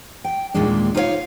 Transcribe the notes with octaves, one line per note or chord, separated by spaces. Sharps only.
G5
D#2 A#2 D#3 G#3 A#3 D4
D#4 F4 G4 C5 C#5 F5